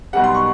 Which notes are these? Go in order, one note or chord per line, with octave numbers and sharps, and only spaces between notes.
B1 B2 G3 F#5
C6
C#6